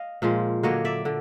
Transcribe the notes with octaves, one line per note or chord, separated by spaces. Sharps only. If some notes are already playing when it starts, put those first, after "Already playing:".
Already playing: D#5 F5
A#2 F3 G#3
D3 F#3 A#3 C#5 D#5
D5 E5
D3